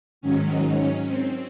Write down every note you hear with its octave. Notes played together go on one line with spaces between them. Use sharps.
G#2 D#3 F#3 C#4
D#4
C#4
C4